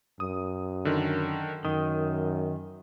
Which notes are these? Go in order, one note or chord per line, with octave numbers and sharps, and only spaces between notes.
F#2 D#6
D3 D#3
F#2 D#3 D#6